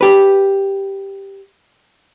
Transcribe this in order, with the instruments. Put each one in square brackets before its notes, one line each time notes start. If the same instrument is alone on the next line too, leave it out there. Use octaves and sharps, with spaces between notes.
[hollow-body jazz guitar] G4 B4